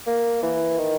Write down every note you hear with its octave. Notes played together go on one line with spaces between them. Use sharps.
A#3
E3
D#3